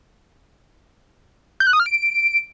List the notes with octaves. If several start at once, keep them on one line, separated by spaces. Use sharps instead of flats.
G6
F#6
D#6
F6
D7